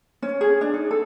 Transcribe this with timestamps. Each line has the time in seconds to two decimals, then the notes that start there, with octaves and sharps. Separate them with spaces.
0.22 C#4
0.41 G#4
0.61 D4
0.74 D#4
0.91 A4